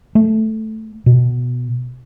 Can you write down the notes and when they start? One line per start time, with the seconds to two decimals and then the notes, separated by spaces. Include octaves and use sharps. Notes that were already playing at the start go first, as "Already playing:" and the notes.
0.15 A3
1.06 B2